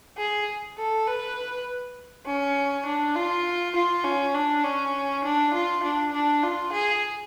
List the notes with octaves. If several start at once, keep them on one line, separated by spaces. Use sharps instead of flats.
G#4
A4
B4
C#4
D4
F4
F4
C#4
D4
C#4
D4
F4
D4
D4
F4
G#4